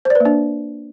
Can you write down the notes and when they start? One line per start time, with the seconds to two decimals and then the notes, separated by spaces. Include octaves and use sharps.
0.05 C5
0.10 D5
0.15 B4
0.20 A#3
0.25 D4